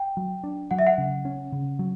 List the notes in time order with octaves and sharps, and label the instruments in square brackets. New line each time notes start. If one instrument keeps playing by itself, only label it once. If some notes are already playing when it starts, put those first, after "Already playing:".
Already playing: [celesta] G5
[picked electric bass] F#3
D4
[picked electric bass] F#3 [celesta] F#5
[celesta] E5
F#5
[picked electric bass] C#3
C#4
C#3
F#3